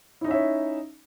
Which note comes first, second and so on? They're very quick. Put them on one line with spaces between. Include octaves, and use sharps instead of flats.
E4 D#4 C#4 E5 C#5